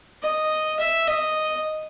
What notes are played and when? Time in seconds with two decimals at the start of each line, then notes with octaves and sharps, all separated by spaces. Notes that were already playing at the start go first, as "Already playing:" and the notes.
0.22 D#5
0.80 E5
1.07 D#5